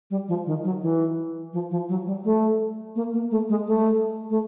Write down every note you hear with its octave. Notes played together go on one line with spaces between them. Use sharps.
G3
F3
D#3
F#3
E3
F3
F3
F#3
G3
A3
A#3
A#3
A3
G#3
A3
A3